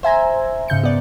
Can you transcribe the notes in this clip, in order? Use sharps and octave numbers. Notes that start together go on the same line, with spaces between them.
C5 E5 G#5 A#5
G#2 C#3 G6 C#7
B3 D5